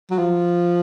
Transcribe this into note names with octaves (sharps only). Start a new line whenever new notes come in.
F#3
F3